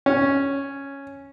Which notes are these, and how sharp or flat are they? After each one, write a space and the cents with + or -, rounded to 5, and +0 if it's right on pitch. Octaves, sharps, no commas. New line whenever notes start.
C#4 -5